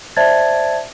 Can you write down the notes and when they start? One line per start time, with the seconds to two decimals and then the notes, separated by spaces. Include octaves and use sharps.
0.17 C5 D5 E5 A5 G#6 A6